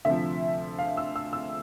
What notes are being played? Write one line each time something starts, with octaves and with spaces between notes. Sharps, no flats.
D2 C3 F3 E5
F5
E6
E6
E6